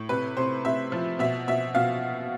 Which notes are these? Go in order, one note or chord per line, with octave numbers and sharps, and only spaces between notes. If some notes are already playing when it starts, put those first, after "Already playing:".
Already playing: A2
C3 B4
C3 C5
C3 E5
F3
B2 E5
B2 E5
B2 F5